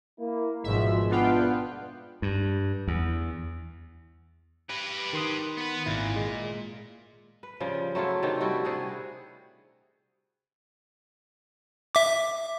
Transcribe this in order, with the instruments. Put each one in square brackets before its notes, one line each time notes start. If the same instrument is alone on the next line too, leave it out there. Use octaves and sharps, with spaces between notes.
[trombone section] A#3 E4
[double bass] G#1 F3 [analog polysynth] B2 E5 [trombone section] G#3
[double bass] B3 [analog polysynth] D4 F4 G5
[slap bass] G2
E2
[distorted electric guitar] G4 B4
[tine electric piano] D#3 C6 D#6
[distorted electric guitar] B3 B4
[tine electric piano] G#1 E4 [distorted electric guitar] A#2
[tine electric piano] G#3
[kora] B4
C#3 F3 G3
F#3 A3 E4 F4
C3 D#3 A3 D4
G3 E4 F#4
C3 G#4 F#5
[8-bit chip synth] E5 D6